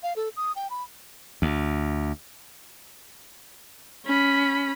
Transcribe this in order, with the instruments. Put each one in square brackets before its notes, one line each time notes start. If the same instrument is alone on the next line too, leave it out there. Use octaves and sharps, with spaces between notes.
[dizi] F5
A4
D#6
G5
B5
[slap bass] D2
[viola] C#4 B5